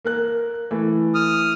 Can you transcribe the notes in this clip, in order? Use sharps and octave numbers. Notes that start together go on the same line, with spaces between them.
A#3 A#4 F#6
E3 A3
D#6 F6